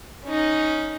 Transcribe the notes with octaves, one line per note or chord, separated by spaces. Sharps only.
C#4 D#4